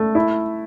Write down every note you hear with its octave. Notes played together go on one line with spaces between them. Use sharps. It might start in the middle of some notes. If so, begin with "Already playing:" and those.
Already playing: A3
E4